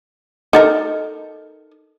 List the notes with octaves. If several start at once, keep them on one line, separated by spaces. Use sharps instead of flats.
D#4 A4 A#4